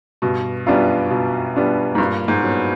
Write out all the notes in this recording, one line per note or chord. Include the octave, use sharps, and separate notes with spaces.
G2 B2
F#2 G3 B3 D4 F4
B2
G3 B3 D4 F4
G#2
G2 A#2
G#2
F#3 B3